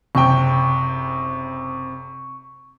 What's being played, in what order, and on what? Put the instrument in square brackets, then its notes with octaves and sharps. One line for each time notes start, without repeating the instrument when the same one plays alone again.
[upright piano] F#1 C3 G5 [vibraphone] C#6